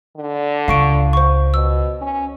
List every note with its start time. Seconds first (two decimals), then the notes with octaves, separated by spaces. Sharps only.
0.17 D3
0.68 C#2 F5 C#6 D7
1.13 C5 C#6
1.54 B2 E6
2.01 C#4